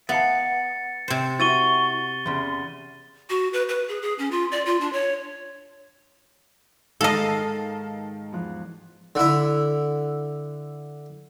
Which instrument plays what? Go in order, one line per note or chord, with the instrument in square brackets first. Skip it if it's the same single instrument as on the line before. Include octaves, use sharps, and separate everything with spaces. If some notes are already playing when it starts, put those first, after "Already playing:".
[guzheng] B3 [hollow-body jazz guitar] E5 F5 A5 [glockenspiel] A6 C#7
[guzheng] C3 C5
[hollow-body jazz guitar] E4 F#4 [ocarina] C#6 [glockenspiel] A6 D#7 G7
[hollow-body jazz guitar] E2 C#3 [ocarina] C6
[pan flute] F#4
B4
B4
G#4
G#4
C#4
F4
D5
F4
D4
C#5
[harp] G#2 [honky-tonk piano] D#3 F5 A5 [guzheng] A4 D#5
[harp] E2 F3 F#6
[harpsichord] D3 E4